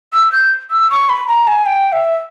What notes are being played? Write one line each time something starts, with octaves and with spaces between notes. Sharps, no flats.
E6
G6
E6
C#6
B5
A#5
G#5
G5
E5